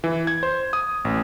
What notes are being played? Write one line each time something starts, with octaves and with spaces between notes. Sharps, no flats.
E3
G#6
C5
D#6
A1